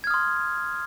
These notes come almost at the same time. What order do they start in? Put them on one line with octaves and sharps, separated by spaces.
G#6 F6 D#6 C6